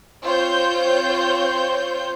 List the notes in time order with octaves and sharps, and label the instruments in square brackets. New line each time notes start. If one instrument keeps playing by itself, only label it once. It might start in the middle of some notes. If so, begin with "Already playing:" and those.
[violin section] C4 F4 C5 C#5 G6